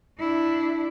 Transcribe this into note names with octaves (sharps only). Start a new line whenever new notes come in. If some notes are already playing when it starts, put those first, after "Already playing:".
D4 E4